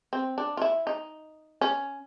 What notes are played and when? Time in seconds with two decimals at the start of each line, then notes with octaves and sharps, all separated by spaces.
0.13 C4
0.38 D4
0.57 F4
0.62 E4
0.87 D#4
1.61 C#4